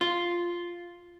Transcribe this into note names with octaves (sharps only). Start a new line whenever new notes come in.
F4